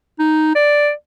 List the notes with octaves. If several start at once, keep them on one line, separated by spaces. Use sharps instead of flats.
D#4
D5